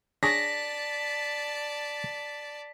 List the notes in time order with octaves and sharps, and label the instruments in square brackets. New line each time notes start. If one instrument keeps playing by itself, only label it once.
[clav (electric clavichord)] D4 G#4 C#5 [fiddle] D5 A5 [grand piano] A#6 [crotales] B6